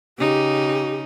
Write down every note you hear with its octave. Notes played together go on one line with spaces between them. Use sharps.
C#3 D#4 G4